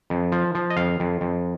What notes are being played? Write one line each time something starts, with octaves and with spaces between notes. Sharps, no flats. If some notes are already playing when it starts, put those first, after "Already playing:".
F2
F3
F3
D#5
F2 F5
F2
F2